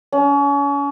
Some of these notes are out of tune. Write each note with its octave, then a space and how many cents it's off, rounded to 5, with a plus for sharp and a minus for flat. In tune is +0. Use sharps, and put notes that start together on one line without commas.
C#4 +35